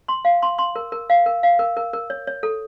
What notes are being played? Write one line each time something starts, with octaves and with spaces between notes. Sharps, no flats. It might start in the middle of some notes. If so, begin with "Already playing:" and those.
C6
F5
C6
C6
A#4
A#4
F5
A#4
F5
A#4
A#4
A#4
C#5
C#5
A4